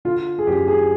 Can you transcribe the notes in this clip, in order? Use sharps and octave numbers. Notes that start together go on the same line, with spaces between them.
D3 F4
G#4
F#2 G4
G#4